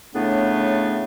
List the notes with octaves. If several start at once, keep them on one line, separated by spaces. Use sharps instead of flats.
A2 C#3 A3 B3 D4